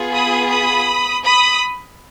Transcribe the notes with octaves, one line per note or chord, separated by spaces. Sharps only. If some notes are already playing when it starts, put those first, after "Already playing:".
Already playing: B3 F4 G#4
B5 D#6
B5 D#6
B5 D#6